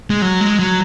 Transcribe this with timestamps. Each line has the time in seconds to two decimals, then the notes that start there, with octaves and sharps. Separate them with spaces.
0.10 G#3
0.22 F#3
0.41 G#3
0.59 F#3